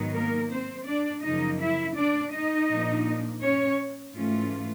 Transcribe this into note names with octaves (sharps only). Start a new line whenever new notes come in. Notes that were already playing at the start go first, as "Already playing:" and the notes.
Already playing: G#2 D#3 F#3 B3 D#4
A#3 A#4
C4 C5
D4 D5
F#2 C#3 F3 A#3 D#4 D#5
E4 E5
D4 D5
D#4 D#5
A#2 F3 A#3 D4
C#4 C#5
G#2 E3 A3 C#4 F4